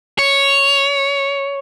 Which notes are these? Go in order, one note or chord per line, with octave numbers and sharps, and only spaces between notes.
C#5